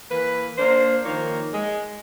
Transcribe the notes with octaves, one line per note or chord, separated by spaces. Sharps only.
E3 A#3 B4
A#3 D4 C5
D#3 F3 A#3 D#4 C#5
G#3